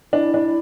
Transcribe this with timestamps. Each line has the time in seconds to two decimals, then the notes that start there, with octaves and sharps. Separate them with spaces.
0.13 D4 E4
0.34 D4